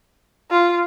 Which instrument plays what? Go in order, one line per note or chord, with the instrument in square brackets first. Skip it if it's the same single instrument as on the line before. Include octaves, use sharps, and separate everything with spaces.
[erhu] F4